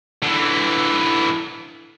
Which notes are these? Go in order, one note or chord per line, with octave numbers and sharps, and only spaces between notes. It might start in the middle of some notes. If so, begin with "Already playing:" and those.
D3 E3